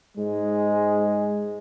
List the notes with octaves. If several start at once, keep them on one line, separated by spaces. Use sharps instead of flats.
G#2 G#3